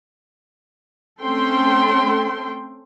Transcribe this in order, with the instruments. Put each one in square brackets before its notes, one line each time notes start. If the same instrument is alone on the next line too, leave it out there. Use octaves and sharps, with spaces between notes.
[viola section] A3 C4 C#4 A4 G5 C6